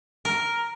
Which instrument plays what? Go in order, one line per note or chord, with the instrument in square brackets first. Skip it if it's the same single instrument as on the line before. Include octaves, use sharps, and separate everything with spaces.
[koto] A#4